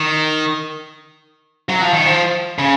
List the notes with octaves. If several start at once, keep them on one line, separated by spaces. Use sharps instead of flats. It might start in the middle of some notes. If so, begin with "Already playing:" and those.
Already playing: D#3
F#3
F3
D#3
F3
C#3